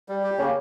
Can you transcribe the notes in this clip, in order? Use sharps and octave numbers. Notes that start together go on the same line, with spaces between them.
G3
G4
C#3 A#3